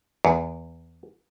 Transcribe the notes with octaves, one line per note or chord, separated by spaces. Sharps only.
E2